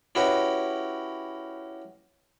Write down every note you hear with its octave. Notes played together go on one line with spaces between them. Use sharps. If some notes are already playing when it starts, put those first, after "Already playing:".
C#4 E4 F#4 G4 B4 D#5